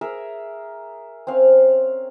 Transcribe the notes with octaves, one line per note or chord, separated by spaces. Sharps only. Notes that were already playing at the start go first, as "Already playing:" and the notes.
G#4 A#4 E5
C4 C#4 F5